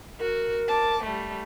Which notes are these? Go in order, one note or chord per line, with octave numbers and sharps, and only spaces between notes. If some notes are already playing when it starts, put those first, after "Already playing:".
F#4 A#4
A5 D6
G3 A3